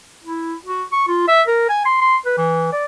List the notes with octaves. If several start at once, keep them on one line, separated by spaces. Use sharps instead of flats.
E4
F#4
C#6
F4
E5
A#4
G#5
C6
C6
B4
E3
D5